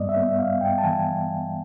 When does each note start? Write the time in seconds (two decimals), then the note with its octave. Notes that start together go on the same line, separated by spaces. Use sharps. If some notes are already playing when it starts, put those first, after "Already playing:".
Already playing: G2 G3 B3 D5 D#5
0.09 E5
0.17 B3
0.38 G2 F5
0.61 G2 G5
0.78 A5
0.84 E3 G#5